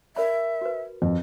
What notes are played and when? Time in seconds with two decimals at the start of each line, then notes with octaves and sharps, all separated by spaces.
0.16 A#4 D5 E5 B5
0.62 F#4 B4
1.02 F2